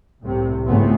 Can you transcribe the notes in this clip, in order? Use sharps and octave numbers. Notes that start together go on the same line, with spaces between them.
C2 A2 C3
G#1 C#2 E3 A3 B3 C4